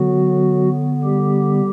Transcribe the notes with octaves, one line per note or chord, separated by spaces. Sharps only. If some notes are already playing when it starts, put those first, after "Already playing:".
Already playing: D3 F#3 B3 F#4
G3 G4